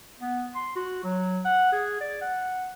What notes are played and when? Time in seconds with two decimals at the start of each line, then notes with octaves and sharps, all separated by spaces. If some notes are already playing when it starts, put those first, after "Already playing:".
0.20 B3
0.55 C6
0.76 F#4
1.04 F#3
1.45 F#5
1.73 G#4
2.01 D5
2.21 F#5